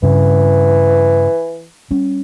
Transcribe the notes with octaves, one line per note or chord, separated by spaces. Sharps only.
G2 C#3 E3
G3 C#4